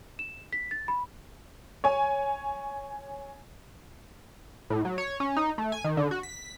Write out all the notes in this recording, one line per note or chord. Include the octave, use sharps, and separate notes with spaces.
E7
B6
A6
B5
C#5 G#5
A2
F#3
C#5
C#4
D#4
A3
G#5
D#3
D3
F#4
B6